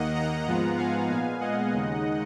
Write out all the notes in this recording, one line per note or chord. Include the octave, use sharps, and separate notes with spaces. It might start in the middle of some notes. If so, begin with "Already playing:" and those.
Already playing: D#2 D#3 A#3 D#5 F#5
F#5 A#5
G#2 F3 G#3 B3 F4
F5 G#5
A#2 G#3 B3 F5 G#5
D#5 F#5
D#2 C#3 G#3 D#4